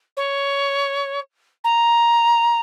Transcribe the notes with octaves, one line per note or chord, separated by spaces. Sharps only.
C#5
A#5